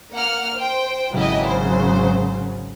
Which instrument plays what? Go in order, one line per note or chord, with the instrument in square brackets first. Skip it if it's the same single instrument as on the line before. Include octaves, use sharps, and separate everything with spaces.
[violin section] A#3 F#5 F6
C5 G5
[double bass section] G#1 C#3 F#3 [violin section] E4 G4 D#5
[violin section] C5